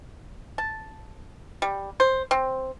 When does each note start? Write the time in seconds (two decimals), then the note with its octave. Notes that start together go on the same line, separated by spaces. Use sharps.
0.58 A5
1.62 G3
2.00 C5
2.31 C4